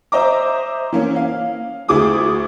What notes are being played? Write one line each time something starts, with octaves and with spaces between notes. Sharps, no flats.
C5 D#5 E5 A#5 D6
E3 A#3 C#4
F5
D2 E4 G#4 D6 D#6